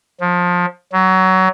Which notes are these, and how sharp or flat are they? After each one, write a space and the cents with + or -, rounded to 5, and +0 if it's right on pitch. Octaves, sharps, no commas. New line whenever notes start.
F3 +25
F#3 +20